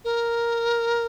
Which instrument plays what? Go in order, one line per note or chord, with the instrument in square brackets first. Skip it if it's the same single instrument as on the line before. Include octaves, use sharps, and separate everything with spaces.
[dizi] A#4